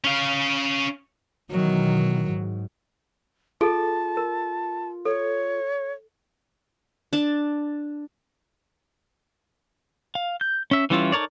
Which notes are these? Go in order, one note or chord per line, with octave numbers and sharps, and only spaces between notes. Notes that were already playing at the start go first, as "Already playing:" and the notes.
C#4 F5
B2 D#3 E3 F#3
G#2
F4 G#4 A4 A5
A#4
A4 C#5
D4 A5
F5
G6
C#4 E5
E3 G3 C#4 E4 F4
D#4 A4 A#4 C#5 D5